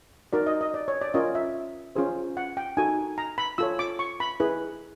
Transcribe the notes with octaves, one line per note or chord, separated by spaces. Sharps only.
D#4 F#4 A#4 D5
D#5
D#5
D5
C#5
D5
C#4 F4 A#4 C#5 D#5
E5
C#4 F4 G#4 C5
F#5
G5
D#4 F#4 A4 G#5
A#5
B5
F4 A4 C#5 E6
D6
C#6
B5
E4 G#4 B4